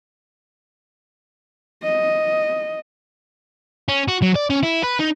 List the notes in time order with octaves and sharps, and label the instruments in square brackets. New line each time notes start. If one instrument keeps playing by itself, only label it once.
[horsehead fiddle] D#5
[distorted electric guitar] C#4
F#4
F#3
D5
C#4
E4
B4
D#4